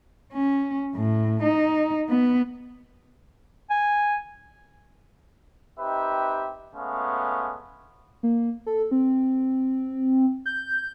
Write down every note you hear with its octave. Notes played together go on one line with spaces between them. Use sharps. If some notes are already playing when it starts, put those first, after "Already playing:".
C#4
A2
D#4
B3
G#5
C4 D#4 G4 B4 E5
G#3 A3 B3 C#4 F5
A#3
A4
C4
G6